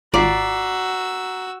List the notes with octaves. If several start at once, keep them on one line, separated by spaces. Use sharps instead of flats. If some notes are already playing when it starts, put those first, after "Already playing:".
G#1 F4 F#4 D5 A#5 E6 B6 C7